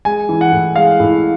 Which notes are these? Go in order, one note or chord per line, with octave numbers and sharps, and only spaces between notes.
G#3 G#5
E3
F#5
A2
G#3 F5
A2